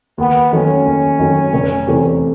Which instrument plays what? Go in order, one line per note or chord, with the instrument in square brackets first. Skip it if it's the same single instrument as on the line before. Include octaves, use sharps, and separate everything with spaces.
[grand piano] D#2 [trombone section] B3
[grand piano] D#3 F#3 A3 [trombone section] C#4
[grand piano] D#2
D#3 F#3 A3
F1
E2 C3 E3 A3